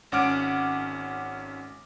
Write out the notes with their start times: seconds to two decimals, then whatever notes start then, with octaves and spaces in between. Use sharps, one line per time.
0.12 G#1 C#4 F#5 D6 F6 D7